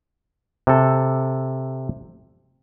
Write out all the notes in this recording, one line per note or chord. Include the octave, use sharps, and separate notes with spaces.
C3 A4